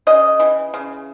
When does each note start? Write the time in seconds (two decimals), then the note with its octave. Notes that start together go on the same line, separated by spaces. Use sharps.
0.07 C#3 D#5
0.40 E3
0.74 C#3